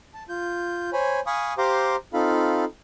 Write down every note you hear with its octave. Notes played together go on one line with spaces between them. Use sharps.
A5
F4 G6
C5 C#5 G#5 B5
F5 G#5 B5 C#6 D#6
G4 C5 F5 A#5 C6 D6
C4 D#4 F4 A4 F5 B5